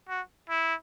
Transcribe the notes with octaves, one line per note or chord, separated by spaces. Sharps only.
F#4
E4